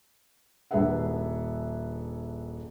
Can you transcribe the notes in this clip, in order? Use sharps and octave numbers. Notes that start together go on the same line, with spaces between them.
D#1 D4 G#4 B4 E5 F#5